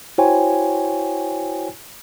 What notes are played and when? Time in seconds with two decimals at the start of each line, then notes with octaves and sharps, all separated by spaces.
0.18 E4 F#4 C5 C#5 G5 G#5